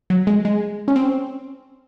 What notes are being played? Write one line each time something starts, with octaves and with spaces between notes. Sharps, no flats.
F#3
G#3
G#3
C#4
C4